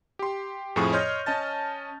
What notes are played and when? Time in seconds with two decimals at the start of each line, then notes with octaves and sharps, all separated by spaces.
0.19 G4 C6
0.76 F2 A2 F3 G#4 C#6
0.93 C#5 D#5 C6 F6 G6
1.26 C#4 D#5 A5 A6